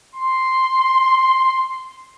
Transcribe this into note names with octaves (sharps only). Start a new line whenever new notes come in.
C6